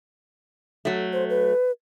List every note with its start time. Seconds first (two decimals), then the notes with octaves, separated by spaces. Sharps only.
0.85 F#3 A3
1.13 C5
1.30 B4